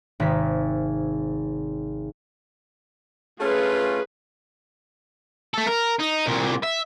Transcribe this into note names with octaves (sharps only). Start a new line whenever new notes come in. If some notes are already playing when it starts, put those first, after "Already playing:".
G#1 C3 B6
A3 C#4 F4 G#4 B4
A3 A4
A#4
D#4
C2 A#2
E5